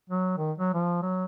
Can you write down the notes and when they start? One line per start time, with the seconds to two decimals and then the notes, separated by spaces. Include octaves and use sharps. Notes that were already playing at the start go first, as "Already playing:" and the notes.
0.10 F#3
0.37 D#3
0.58 F#3
0.74 F3
1.02 F#3